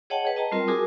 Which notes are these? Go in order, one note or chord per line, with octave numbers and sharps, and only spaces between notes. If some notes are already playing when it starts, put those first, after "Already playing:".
G#4 C#5 D#5 F#5 G5 A5
G#4 B4
D#5 G5 A5 A#5
G3 C4 F4 A#4
F#4 G#4 A#4 G#5 D6 D#6